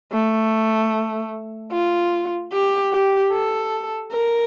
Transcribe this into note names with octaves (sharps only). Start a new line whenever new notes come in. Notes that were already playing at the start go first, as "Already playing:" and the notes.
A3
F4
G4
G4
A4
A#4